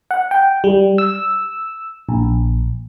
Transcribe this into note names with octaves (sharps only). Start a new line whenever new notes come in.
F#5
G5
G3
E6
A#1